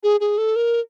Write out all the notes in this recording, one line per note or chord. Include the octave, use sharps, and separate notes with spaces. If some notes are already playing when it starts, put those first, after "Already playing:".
G#4
G#4
A4
A#4